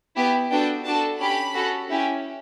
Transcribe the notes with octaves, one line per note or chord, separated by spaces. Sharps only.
B3 E4 G4
B3 D4 F#4 A4 G5
D4 F#4 A4 A5
C#4 G4 B5
C#4 F#4 A4
C#4 E4 G4